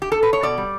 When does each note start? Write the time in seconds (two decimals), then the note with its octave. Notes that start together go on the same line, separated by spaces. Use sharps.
0.02 G4
0.12 A4
0.23 B4
0.33 C#5
0.43 B2 D5
0.58 G3